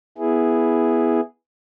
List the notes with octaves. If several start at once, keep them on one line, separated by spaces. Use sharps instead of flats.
B3 E4 G#4